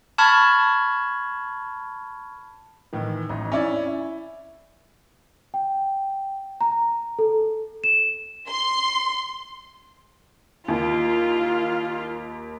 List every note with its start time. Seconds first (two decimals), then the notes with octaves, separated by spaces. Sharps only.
0.18 A5 B5 C#6 F6 G#6
2.93 A2 D#3 E3
3.29 A1 D#4
3.52 C#4 E4 D5
3.87 E4
5.54 G5
6.61 A#5
7.19 A4
7.84 E7
8.48 C6
10.68 D#2 F4